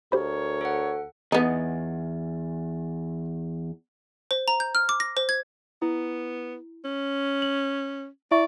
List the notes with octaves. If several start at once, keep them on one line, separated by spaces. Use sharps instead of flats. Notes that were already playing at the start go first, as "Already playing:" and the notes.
D2 G4 A#4 C5 C#5 B5
A4 F#5
E2 B3 D#4
C5
A#5
G6
F6
D6
A#6
C5
G#6
B3 E4
C#4
F#7
E4 D5 E5 C#6